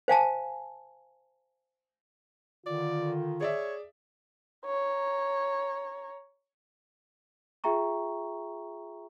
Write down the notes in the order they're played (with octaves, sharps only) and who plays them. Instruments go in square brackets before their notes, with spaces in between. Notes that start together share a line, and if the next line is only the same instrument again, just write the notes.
[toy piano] C5 F5 G#5 A5
[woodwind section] D3 D#3 [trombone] F4 [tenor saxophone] D5
[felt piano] G#4 D5 E5 [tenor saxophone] C#5
[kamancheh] C#5 A#5
[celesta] F4 G#4 E5 G5 A#5 C#6